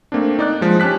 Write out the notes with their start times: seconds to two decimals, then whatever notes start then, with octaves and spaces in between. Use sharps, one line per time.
0.12 A3 A#3 C4 D4
0.39 D#4 D5 F#6
0.61 F3 G#3
0.80 C#4 G4 A5 F#6 B6